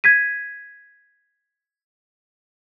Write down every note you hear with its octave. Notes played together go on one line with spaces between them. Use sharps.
G#6 B6 D#7